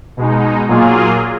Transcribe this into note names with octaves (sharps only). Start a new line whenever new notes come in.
B2 G#3 D#4
A#2 F#3 A#3 F4 G#4